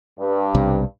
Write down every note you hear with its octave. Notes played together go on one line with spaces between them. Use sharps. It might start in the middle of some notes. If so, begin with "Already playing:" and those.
G2
B1 C3 G3